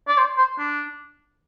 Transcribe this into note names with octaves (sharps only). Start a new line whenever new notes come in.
D5
C5
C5
D4